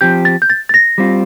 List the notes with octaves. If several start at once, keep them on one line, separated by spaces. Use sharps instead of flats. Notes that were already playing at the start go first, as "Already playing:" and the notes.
F3 C4 G4 G6
A6
G6
A6
A6
A#6
G3 C4 F4